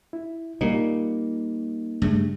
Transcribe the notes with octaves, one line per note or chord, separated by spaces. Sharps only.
E4
A#2 G3 A#3 D#4
G2 C#3 A3